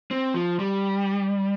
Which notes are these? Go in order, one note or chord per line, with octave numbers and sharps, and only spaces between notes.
C4
F3
G3